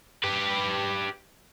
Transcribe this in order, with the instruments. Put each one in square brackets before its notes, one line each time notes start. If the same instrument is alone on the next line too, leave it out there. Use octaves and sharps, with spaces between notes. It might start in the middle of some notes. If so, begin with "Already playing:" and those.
[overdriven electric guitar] G4 B4